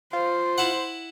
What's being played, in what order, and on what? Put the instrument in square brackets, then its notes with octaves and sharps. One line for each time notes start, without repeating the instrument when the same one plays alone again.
[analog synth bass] F4 [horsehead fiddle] C5
[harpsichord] E4 F#5